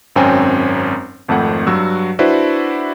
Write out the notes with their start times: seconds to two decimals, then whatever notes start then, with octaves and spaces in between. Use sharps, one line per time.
0.16 G#1 F#2 C4 C#4 G5 G#5
1.28 G#1 F2 A3 F#5
1.67 G2 F#3 F#4 E6
2.19 D4 E4 F#4 B4 C5 D5